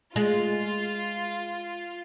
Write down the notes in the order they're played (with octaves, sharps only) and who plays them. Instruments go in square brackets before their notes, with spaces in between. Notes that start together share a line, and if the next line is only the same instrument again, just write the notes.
[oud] G#3 [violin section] F4